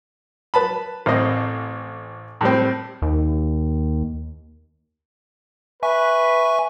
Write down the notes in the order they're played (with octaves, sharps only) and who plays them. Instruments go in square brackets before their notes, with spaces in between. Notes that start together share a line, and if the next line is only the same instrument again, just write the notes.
[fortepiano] B4 A5 B5
A1 C4 D#5
A2 G3 C4
[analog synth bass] D#2
[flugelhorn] B4 [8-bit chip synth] E5 G#5 C#6